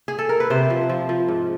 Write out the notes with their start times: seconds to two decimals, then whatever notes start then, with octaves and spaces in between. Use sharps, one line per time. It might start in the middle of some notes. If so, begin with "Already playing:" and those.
0.08 G#4
0.19 A4
0.29 A#4
0.40 B4
0.50 C3 C5
0.70 F3
0.89 F3
1.09 F3
1.28 G#2